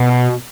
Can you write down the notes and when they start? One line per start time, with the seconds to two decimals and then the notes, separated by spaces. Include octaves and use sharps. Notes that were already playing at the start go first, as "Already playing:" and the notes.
Already playing: B2